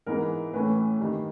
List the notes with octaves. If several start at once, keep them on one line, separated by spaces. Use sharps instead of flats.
G#2 E3 G#3 B3 A#4
A2 E3 A3 C#4 B4
G2 D#3 G3